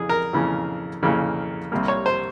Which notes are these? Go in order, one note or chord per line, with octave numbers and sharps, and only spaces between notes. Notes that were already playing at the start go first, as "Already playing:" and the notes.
Already playing: F2 C#3 E3 G#4
A#4
F2 C#3 E3 A#3
F2 C#3 E3 A#3
C2 C3 G3 A#3
C#5
C5